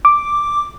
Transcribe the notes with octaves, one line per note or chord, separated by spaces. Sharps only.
D6